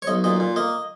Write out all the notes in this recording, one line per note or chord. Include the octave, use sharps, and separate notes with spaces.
C#5
B1 D#5
A#2 D#5
A#2
A#3 D#5